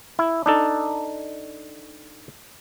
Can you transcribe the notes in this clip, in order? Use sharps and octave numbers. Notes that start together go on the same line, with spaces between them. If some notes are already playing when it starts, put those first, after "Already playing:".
E4
D4 D#4 A4